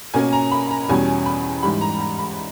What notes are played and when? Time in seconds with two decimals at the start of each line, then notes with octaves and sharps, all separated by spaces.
0.14 B2 A#3 C#4 G#5
0.33 A#5
0.51 B5
0.71 A#5
0.89 E2 B2 G3 C#4 G#5
1.26 B5
1.63 G#2 E3 G3 B5
1.81 A#5
2.00 A#5
2.19 B5